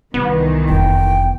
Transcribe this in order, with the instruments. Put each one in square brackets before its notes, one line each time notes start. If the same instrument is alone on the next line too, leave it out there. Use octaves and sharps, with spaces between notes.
[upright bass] C2 [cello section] D#3 E3 [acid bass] B3
[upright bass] F1 E2 [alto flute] G5